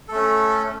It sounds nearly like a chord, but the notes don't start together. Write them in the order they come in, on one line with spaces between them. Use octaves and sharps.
A4 A3 C#4